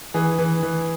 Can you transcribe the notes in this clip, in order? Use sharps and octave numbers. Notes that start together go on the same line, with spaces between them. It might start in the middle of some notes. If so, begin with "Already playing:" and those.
E3 G#4
E3
E3